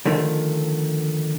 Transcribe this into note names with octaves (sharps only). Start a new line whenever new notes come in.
D3 D#3 F3 A3